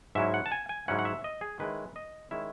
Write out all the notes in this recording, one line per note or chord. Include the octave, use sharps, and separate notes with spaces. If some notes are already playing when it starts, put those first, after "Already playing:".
G#2 F#3 C#4 E4 E5
F#5
A5
G#5
G#5
G#2 F#3 C#4 E4 F#5
F#5
E5
D#5
G#4
D#3 G#3 C#4 E4 B4
D#5
D#3 G#3 C#4 E4 E5